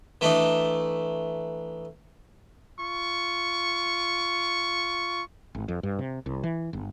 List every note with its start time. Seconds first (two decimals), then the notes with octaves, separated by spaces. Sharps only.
0.21 E3 A3 D4 D#4
2.80 F4 C#6
5.55 G#1
5.68 F2
5.83 G2
5.99 C3
6.26 C2
6.43 E3
6.73 G1